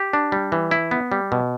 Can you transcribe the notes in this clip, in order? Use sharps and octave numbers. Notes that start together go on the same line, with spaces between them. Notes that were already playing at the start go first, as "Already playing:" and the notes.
Already playing: G4
D4
G3
E3
E4
B3
G3
B2